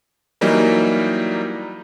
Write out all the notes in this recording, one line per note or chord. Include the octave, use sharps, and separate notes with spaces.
E3 F#3 G3 A#3 D#4